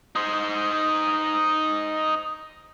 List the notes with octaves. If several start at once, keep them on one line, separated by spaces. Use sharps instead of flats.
D#4 C5